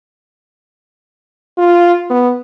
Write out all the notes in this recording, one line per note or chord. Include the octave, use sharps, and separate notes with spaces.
F4
B3